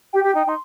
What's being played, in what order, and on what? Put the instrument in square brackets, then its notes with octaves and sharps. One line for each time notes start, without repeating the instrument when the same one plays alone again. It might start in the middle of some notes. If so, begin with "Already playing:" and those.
[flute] G4 [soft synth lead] G5
[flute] G4
D#4
[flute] D#4 [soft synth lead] C6